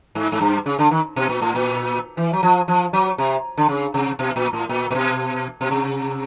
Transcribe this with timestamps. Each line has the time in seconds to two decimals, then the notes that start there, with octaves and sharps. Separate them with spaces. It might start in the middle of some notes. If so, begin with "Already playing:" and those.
0.15 G#2
0.32 G#2
0.41 G2
0.66 C#3
0.79 D3
0.91 D#3
1.16 B2
1.29 A#2
1.42 A2
1.55 A#2
2.17 E3
2.33 F#3
2.43 F3
2.68 F3
2.93 F#3
3.18 C3
3.58 D3
3.68 C#3
3.94 C3
4.19 B2
4.36 A#2
4.53 A2
4.69 A#2
4.91 A#2
4.95 B2
5.61 B2
5.71 C3